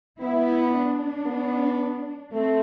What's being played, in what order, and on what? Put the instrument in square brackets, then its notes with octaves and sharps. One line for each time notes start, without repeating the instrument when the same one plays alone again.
[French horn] B3 [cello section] E4
[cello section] D4
[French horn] B3
[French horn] A3 [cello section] C4